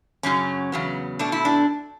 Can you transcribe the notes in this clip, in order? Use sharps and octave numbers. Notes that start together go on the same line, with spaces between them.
F#2 C#3 F#3 C#4
E2 C#3 F#3 B3
B2 A3 D4
E4
D4